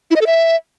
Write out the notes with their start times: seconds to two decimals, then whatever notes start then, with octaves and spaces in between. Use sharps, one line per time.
0.11 E4
0.16 D#5
0.21 A4
0.26 E5